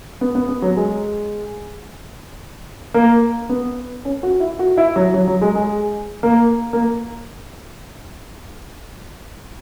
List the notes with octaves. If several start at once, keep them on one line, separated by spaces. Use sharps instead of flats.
B3
B3
B3
F#3
G#3
A#3
B3
C#4
F#4
E4
F#4
E4
F#3
F#3
F#3
G#3
G#3
A#3
A#3